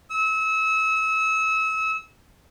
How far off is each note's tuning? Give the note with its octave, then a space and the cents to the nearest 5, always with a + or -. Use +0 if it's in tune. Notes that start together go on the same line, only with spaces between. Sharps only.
E6 -30